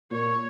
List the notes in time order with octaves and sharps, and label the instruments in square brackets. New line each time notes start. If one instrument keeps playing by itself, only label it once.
[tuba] A#2 [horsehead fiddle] C#5